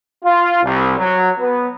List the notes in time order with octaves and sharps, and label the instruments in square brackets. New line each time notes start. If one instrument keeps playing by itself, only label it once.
[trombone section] F4
C2
F#3
B3